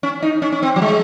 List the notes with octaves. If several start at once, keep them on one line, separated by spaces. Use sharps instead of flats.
C#4
D#4
C#4
C#4
C4
F#3
G#3